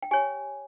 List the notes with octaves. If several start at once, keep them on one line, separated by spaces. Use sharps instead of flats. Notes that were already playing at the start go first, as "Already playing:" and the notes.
G5
G4 C#5 G#5